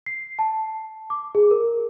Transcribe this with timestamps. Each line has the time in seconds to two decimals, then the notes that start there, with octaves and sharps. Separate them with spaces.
0.06 C7
0.39 A5
1.10 D6
1.35 G#4
1.51 A#4